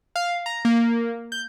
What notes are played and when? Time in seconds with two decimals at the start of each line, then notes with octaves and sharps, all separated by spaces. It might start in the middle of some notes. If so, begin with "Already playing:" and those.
0.16 F5
0.46 A#5
0.65 A#3
1.32 G6